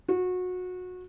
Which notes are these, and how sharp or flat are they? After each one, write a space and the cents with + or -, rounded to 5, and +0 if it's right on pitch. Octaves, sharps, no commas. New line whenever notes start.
F#4 -25